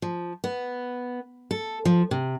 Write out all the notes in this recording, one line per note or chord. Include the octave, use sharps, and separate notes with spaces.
F3
B3
A4
F3
C3